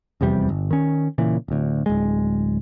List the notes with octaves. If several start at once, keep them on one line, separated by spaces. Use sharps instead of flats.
F1 E2 C3 G3
G1
D#3 C#4
A#2 C#3 E3
D1 D2
D1 G#3